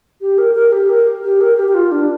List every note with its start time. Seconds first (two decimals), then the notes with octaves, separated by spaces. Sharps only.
0.21 G4
0.38 A#4
0.55 A#4
0.72 G4
0.89 A#4
1.24 G4
1.41 A#4
1.57 G4
1.68 G4
1.75 F4
1.92 D4